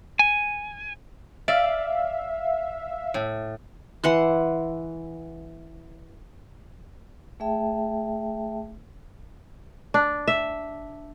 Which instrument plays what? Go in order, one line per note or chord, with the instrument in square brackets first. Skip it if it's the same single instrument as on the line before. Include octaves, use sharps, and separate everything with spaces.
[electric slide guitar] G#5
[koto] D5 [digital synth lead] E5 [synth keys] F5
[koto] A2
[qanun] E3 F#5 C6
[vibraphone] A3 G#4 E5 G5 A5
[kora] D4
E5